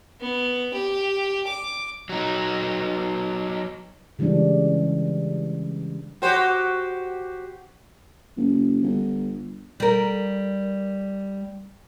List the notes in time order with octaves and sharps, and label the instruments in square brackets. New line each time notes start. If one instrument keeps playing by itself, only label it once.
[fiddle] B3
G4
D6
[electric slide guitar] F#3 D#4
[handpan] C#3 E3 G3 G#3 D4
[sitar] F#4 G4 C5
[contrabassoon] F#1
G1
[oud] G3 A#4